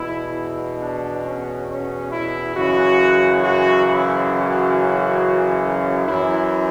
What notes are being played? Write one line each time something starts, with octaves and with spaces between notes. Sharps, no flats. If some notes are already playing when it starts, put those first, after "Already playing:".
Already playing: E2 B2 E4
D4
C#4
C#4
E4
F#2 C#3 E3 F#4
F#4
E4
F#4
F#2 E3 E4